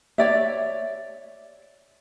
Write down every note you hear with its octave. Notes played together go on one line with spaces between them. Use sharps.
C#5 D5 E5